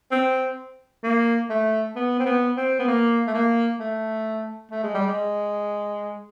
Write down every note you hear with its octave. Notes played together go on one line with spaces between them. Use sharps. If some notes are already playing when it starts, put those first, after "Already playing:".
C4
A#3
A3
B3
C4
B3
C4
B3
A#3
A3
A#3
A3
A3
G#3
G3
G#3